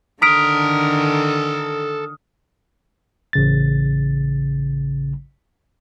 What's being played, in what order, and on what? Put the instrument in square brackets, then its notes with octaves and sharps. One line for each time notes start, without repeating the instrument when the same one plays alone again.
[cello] D3 D#3 [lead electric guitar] A4 A#5 [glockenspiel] D#6 F6 [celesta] B6 D7
[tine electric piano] A1 C#3 A6